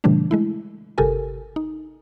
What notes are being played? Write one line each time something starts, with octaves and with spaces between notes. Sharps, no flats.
A#2 C#3 E3 G3 A3 D4
G#3 A3 E4
G1 C3 G4 A4 A#4 G#5
D#4